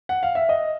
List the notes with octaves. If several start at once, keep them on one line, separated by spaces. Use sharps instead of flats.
F#5
F5
E5
D#5